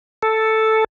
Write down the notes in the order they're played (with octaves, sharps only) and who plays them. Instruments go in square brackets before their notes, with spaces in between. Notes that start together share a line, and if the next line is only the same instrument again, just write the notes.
[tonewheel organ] A4